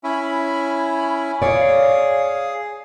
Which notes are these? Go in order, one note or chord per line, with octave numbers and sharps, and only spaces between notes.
C#4 E4 B5
G#4 C#5 D5 F5